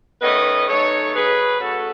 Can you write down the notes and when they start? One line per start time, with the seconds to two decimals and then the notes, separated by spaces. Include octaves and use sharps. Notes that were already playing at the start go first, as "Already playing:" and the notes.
0.21 D#3 A3 C#4 B4 D#5
0.67 B2 F#3 A3 D#4 A4 C#5
1.14 C#3 F#3 C#4 G#4 B4
1.61 A3 C#4 F#4 A4